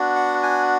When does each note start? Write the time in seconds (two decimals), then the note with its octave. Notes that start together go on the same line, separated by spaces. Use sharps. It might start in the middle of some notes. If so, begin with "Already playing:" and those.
Already playing: B3 D4 F#4
0.16 F#5
0.43 G#5